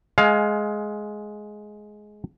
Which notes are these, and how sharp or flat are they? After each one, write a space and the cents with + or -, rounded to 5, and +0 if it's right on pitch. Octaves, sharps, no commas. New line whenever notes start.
G#3 +15 F5 +15 G#5 +30